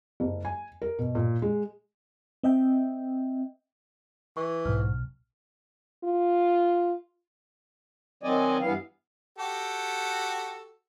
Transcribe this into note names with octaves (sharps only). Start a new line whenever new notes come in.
F#1
G#5
A#4
B2
A#2
G#3
C4 D#5 E5 G5
E3 C#6
B1 G#2 F6
F4
D#3 F#3 C4 D5 D#5 G#5
G2 E3 B3 F5
F#4 G4 A4